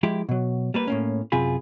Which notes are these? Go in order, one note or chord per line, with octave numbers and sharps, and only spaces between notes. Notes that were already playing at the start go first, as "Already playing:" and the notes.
F3 G#3 E4 G4
B2 F#3
G3 A#3 B4
A2 A#3 C#4
F#2 C3 F4 G#4 B5